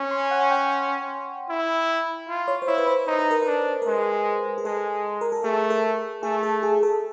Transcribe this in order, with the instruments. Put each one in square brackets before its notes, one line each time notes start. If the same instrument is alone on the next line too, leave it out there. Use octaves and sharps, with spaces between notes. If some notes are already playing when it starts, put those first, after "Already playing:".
Already playing: [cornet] C#4 [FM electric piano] C#6
[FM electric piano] C6
F#5
G5
[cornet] E4
F4
[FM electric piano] C#5
C5
[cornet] E4 [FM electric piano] C#5
[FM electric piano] B4
C5
[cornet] D#4 [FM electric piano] C5
[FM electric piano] B4
A#4
[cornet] D4 [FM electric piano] B4
[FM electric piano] A#4
[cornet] G#3 [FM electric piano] B4
[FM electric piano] G#4
[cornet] G#3 [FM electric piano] A4
[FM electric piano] A#4
A4
[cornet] A3 [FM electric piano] G#4
[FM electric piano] A4
[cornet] A3 [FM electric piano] G#4
[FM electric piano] A4
G#4
A4